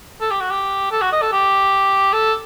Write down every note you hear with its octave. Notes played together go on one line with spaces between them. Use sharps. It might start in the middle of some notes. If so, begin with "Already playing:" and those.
A4
G4
F#4
G4
A4
F#4
D#5
A4
G4
A4